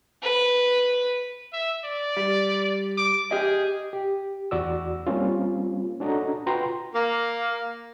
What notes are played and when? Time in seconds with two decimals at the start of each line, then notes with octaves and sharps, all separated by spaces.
0.23 B4
1.53 E5
1.84 D5
2.17 G3
2.98 D6
3.31 G4 G#4 D#5
3.93 G4
4.51 E2 F#4 D5 E6
5.07 G3 A#3 C4 C#4 F4
6.00 C#4 D4 F#4 A4 D#5 A#5
6.46 F4 F#4 B4 G5 A#5 C6
6.95 A#3